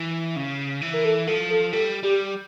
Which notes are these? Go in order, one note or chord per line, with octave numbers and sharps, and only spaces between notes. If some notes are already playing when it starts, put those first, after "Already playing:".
Already playing: E3
C#3
E3
A#4
A4
F3 A4
A4
G3 A4
G3 G4